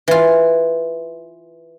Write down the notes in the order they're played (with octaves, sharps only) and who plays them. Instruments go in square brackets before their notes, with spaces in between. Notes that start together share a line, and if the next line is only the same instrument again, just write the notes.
[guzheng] E3 F4